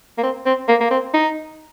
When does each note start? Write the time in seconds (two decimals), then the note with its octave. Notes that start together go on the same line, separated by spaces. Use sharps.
0.18 A#3
0.23 C4
0.46 C4
0.68 A#3
0.80 A#3
0.91 C4
1.14 D#4